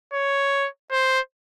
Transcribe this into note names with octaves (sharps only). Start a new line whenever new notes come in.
C#5
C5